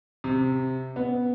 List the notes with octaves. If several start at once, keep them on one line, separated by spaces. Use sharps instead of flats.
C3
B3